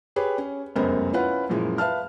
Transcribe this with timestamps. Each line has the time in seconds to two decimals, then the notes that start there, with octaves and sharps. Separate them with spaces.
0.16 G4 G#4 B4 C#5
0.38 C#4
0.76 F1 C#2 F#2 B3 A#4 C5
1.13 C#4 E4 F4 B4 F#5
1.49 F#2 A#2 E3 F3 G#3
1.78 B4 E5 F5 A5 F6